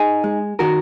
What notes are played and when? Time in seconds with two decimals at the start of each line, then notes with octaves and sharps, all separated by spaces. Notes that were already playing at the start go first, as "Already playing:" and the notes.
Already playing: D#4 G#4
0.24 G#3
0.59 D#3 F#4 A#4